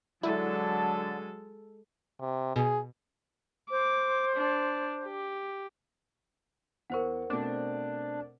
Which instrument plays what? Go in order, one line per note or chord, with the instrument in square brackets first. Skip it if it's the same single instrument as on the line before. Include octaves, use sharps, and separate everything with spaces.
[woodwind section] D3 A5 [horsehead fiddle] F#3 [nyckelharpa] G#3 A4 [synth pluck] E4
[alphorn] C3
[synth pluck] B2 [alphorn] G#4
[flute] C5 [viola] D6
[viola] D4
G4
[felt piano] E2 C#6 [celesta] A#4 C5 F#5
[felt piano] B2 A3 C4 [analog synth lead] D4